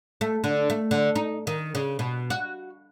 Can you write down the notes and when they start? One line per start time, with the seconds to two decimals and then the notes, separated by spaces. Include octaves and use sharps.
0.21 A3
0.44 D3
0.70 A3
0.91 D3
1.16 D#4
1.47 D#3
1.75 C#3
1.99 B2
2.30 F#4